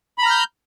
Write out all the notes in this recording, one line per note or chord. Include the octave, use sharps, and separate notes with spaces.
A#5 B5 F6 G6